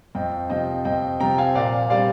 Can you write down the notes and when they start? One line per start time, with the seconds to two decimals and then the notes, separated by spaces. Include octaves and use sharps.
0.15 F2 D#5 G5
0.50 C3 F3 D#5 G5
0.85 F2 D#5 G5
1.20 C3 F3 G5 A#5
1.38 F5 G#5
1.55 A#2 D5 F5
1.90 G3 C4 D5 F5